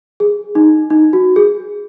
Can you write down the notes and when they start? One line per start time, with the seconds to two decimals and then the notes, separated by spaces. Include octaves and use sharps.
0.20 G#4
0.55 D#4
0.90 D#4
1.13 F#4
1.36 G#4